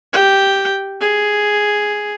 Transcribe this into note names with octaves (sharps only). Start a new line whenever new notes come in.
G4 G5
G#4